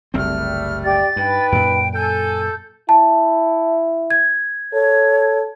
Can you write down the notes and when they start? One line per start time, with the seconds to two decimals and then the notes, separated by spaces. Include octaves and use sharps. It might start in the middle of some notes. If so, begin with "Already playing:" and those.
0.14 F#1 C2 G3 A3 C4 F6
0.84 G4 D5 G5 A6
1.16 G2 D#4 B4 G5
1.52 F#2 A#2 D7
1.94 A4 G#5 G6
2.89 E4 A5
4.10 G#6
4.73 A4 C#5